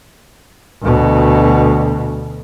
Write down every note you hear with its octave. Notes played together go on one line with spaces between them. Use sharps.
D2 B2